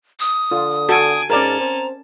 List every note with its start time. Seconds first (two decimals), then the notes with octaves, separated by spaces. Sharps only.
0.20 D#6
0.51 D3 F4
0.89 F#4 A4 G#5 D7
1.30 G#2 C#4 A#4 D5 A5 A#5
1.60 C4